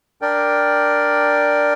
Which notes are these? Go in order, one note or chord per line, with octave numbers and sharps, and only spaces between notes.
D4 A#4 D5 G5